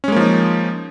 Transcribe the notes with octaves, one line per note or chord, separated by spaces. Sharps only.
F3 G#3 A#3 C#4 D#4